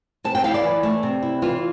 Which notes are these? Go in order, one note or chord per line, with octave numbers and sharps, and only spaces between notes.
C3 A5
G5
E4 F5
D5
E3
A3
C3
E4
E3 F4